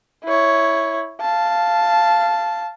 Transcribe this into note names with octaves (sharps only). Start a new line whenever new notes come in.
E4 C#5
F5 A5